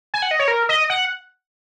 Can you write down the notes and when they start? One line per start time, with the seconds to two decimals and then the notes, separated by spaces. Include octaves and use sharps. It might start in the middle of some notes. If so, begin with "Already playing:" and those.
0.14 G#5
0.22 F#5
0.31 D#5
0.39 C#5
0.48 A#4
0.69 D#5
0.90 F#5